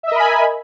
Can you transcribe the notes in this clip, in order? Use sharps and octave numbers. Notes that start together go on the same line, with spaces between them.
A#4 D#5 E5 G#5 B5